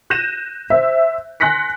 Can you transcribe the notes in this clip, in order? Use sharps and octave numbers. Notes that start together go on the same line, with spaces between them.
F#6 G6 A#6 D#7 E7
C5 E5
G#5 C6 F#6 A#6 B6 C#7